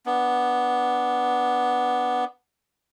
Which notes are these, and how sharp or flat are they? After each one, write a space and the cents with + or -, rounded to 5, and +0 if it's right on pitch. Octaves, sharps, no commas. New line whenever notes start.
B3 +0 D4 +0